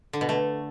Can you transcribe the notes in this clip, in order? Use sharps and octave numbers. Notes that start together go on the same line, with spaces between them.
D3
B2
A3